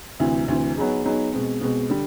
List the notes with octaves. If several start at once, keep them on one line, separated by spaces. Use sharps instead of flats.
D2 C3 E3
D2 C3 E3
F#3 B3 D#4 G#4
F#3 B3 D#4 G#4
B2 G#3 C4
B2 G#3 C4
D3 G3